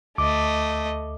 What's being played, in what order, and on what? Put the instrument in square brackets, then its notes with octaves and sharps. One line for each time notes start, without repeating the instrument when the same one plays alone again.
[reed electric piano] D2 D6 [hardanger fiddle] A3 D#5